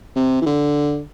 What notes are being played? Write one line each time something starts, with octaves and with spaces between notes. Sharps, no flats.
C3
E3
D3